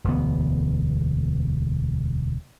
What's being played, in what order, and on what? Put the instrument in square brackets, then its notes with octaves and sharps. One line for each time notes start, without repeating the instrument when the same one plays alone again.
[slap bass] E1 D2 B3